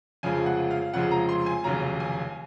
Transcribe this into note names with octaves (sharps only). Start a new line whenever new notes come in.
F1 F2 C#3 F3 G#3 G#5
F#5
F5
F1 F2 C#3 F3 G#3 F#5
A#5
C6
G#5
F1 D#2 C#3 F#3 A#5
G#5